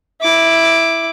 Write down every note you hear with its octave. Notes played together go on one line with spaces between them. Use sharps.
E4 D6